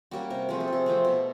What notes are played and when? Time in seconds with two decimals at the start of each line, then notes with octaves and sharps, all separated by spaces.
0.11 G3 A#3 C#4 F#4
0.30 C3 A#4
0.49 F3 A3 C4 G#4
0.60 A4
0.68 C3 G#4
0.86 F3 A3 C4
1.05 B2